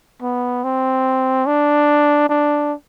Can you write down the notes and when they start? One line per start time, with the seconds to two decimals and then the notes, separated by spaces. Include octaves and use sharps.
0.22 B3
0.64 C4
1.46 D4
2.29 D4